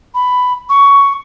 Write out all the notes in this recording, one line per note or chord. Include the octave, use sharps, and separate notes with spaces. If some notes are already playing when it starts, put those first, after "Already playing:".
B5
C#6